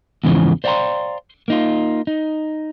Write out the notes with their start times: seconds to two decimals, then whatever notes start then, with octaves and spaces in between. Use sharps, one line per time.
0.24 E2 G#2 C#3 E3 F3
0.64 C5 D5 F5 G5 A#5 C6
1.48 A#3 D#4 F4
2.07 D#4